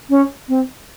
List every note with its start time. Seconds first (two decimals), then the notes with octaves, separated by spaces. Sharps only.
0.10 C#4
0.49 C4